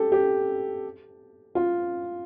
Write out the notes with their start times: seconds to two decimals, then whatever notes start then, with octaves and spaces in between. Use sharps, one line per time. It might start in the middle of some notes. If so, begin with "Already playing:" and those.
Already playing: G4 A4
0.12 G4
1.55 F4